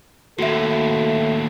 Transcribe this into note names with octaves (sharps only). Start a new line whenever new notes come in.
D#2 A2 F#4 A4 E5